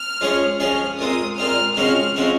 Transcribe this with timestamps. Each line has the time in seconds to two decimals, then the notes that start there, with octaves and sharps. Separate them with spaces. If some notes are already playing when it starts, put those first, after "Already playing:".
Already playing: F6
0.21 F3 G#3 C#4 G#4 C#5
0.60 F3 G#3 C#4 G#4 C#5 F6
0.99 A#2 G#3 C4 D#6
1.37 A#2 G#3 C4 F6
1.76 C#3 F3 G#3 C4 F#4 F6
2.16 C#3 F3 G#3 C4 F#4